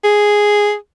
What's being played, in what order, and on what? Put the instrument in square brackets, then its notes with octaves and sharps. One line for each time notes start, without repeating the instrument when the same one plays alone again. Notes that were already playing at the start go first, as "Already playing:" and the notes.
[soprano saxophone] G#4